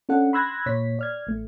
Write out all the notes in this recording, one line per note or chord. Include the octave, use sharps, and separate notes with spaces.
C#4 D4 A4 F#5
B5 C6 E6 F#6 G#6 A#6
A#2 C#5 B6
D5 F6 G#6
A1 A3